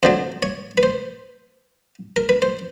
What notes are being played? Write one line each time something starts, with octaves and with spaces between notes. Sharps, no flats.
F2 D3 F#3 C5
C#5
B4
C5
A#4
B4
C5